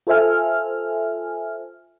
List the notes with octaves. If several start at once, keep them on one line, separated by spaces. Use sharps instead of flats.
F4 A4 C5 E5 G#5 F6